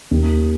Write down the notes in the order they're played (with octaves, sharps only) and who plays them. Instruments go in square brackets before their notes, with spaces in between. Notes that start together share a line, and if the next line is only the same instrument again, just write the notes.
[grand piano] D#2